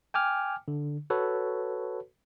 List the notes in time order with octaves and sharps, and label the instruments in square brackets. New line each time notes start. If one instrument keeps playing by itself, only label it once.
[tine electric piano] G5 G#5 D6 F6
D3
F#4 A4 B4 C#5